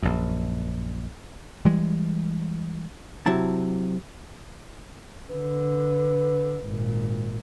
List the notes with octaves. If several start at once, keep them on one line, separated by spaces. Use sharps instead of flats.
A#1 F#2
E3 G3 G#3
C3 F#3 E4 A5
D3 B4
G#1 A#2